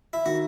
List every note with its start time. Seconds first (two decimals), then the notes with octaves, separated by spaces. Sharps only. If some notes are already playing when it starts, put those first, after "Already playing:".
0.13 E4
0.26 D#3 F#4